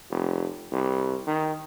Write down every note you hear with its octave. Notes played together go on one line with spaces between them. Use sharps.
F1
C2
D#3